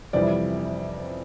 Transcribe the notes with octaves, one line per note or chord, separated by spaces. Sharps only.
F2 C3 E3 G3 D5